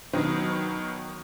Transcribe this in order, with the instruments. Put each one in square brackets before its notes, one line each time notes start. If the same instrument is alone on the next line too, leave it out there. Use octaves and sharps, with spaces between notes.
[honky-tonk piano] B2 D#3 F#3